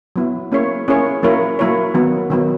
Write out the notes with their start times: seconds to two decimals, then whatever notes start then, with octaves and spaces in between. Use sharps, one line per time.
0.16 F#3 B3 E4
0.52 A#3 C#4 E4 G#4 C#5
0.88 A#3 C#4 E4 G#4 C#5
1.23 F#3 A#3 E4 A#4 C#5
1.59 F#3 A#3 E4 A#4 C#5
1.95 D#3 F#3 B3
2.30 D#3 F#3 B3